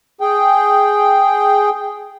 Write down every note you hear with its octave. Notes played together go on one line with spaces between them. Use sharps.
G#4 G5